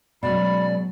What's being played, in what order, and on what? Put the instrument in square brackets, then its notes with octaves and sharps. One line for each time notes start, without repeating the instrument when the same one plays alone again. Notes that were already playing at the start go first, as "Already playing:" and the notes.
[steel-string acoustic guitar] B2 G#3 C#4 [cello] F#3 [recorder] D5 [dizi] B5